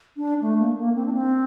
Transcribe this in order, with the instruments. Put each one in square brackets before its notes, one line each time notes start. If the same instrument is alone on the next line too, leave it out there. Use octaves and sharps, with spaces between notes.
[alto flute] D4
A3
A#3
A#3
C4
D4
C4